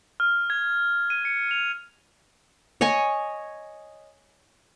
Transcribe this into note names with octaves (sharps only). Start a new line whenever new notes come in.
F6
G#6
D#7
C#7
F7
C#5 D#5 G#5 C#6